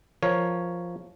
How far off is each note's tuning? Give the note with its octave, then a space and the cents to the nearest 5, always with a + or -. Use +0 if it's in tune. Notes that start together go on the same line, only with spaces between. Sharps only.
F3 +0 A#4 +0 C#5 +0